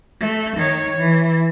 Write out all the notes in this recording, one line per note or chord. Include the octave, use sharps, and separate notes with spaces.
A3
D#3 C#5
E3